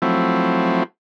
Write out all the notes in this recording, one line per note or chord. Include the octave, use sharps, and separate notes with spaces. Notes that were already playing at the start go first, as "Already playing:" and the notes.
F3 F#3 A3 C4 E4